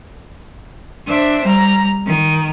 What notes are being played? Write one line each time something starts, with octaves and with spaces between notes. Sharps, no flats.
D4 C5 E5
G3 A#5
D#3